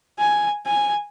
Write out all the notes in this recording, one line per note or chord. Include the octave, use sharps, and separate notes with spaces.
G#5
G#5